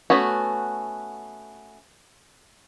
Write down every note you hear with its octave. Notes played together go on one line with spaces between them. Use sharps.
A3 B3 C#4 F#4